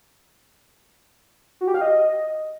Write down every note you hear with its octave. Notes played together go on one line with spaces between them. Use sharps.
F#4
G4
F5
D#5